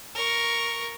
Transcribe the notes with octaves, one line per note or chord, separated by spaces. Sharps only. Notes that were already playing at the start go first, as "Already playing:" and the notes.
A#4 C#6